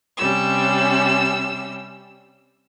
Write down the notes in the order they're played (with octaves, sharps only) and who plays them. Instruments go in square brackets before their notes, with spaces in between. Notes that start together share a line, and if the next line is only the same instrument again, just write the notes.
[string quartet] C3 G3 C#4 E6